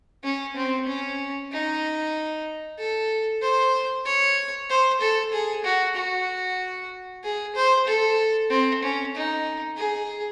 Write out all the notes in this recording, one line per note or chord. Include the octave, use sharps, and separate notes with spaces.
C#4
C4
C#4
D#4
A4
C5
C#5
C5
A4
G#4
F#4
F#4
G#4
C5
A4
C4
C#4
D#4
G#4